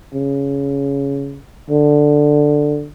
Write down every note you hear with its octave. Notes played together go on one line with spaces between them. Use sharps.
C#3
D3